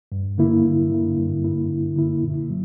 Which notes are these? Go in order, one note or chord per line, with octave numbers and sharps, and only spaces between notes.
G2
D3 A#3 E4
G2
D3 A#3 E4
G2
D3 A#3 E4
G2
D3 A#3 E4
A#2
F#3